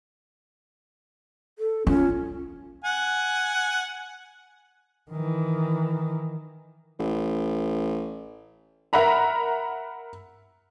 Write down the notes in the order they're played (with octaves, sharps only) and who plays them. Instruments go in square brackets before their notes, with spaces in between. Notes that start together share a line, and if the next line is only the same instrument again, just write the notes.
[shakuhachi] A4
[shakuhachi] C#4 [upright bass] F4
[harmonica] F#5 G#5
[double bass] D#3 E3
[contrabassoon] A1
[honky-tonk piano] A#4 E5 F#5 A#5 B5